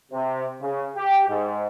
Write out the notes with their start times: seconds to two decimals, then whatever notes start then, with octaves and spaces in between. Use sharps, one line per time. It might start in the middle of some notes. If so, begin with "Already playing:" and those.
0.12 C3
0.61 C#3
0.97 G4
1.28 G#2